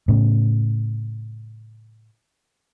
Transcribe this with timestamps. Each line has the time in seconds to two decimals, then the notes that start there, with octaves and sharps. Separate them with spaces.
0.08 A2 C#3